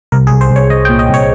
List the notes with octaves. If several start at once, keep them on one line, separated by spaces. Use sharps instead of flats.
C2 A#4
G#4
C2
C5
C2
C#5
C2 D#5
G5
A#2
D#5
C2 C#5